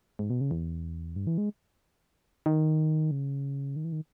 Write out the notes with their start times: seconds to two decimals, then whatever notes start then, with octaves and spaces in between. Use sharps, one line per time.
0.19 G#2
0.30 B2
0.41 C#3
0.51 E2
1.16 G2
1.27 E3
1.38 G#3
2.46 D#3
3.11 C#3
3.76 D#3
3.84 E3
3.92 D#3